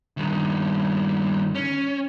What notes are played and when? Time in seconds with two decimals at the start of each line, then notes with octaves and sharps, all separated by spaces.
0.17 G2 D#3
1.55 C#4